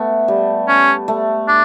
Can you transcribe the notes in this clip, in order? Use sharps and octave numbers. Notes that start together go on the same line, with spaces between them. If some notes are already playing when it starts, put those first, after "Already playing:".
Already playing: A3 B3
G3
C#4
A3
D4